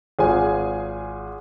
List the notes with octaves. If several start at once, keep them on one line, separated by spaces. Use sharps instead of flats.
G#1 F4 G#4 C5 G#5